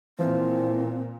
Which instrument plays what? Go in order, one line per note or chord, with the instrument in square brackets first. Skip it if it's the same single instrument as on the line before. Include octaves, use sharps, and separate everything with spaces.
[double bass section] A#2 [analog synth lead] E3 [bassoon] F3 [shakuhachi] C4